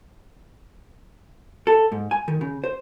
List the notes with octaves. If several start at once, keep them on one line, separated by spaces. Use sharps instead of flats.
A4
G#2
G#5
D#3
C#3
C5